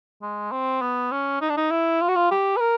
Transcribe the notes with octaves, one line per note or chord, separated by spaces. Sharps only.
G#3
C4
B3
C#4
D#4
D4
D#4
E4
F4
F#4
F4
G4
B4
A#4